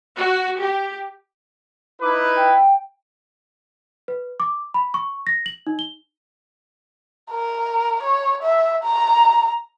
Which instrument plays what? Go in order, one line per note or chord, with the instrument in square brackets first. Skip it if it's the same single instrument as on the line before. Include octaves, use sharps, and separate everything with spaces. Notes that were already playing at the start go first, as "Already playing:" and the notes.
[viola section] F#4
G4
[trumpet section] D#4 E4 B4 [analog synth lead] D6
[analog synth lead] G5
[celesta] B4
D6
B5
C#6
A#6
F#7
D#4
G7
[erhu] A#4
C#5
E5
A#5